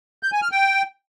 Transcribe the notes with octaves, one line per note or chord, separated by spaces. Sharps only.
G6
G#5
F6
G5